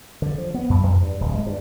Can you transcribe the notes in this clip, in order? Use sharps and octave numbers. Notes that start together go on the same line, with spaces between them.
D3
F3
B3
F#2
F2
G2
D1
G#3
G2